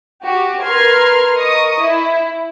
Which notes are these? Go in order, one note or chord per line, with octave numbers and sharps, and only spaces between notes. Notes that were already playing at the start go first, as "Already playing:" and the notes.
F#4 G4
A#4 B4 C6 F6 G#6
A#4 D#5 C#6 D#6
E4